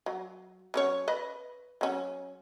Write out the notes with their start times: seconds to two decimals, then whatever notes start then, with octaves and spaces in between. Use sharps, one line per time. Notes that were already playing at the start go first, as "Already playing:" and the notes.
0.06 F#3
0.74 F#3 C#4 C#5
1.08 B4 D#5 B5
1.81 F#3 C#4